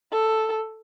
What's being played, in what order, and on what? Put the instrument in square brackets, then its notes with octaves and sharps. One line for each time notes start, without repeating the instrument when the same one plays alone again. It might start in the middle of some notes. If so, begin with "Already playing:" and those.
[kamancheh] A4